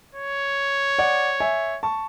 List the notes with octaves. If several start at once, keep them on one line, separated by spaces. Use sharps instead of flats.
C#5
D5 F#5
E5 G#5
A5 C#6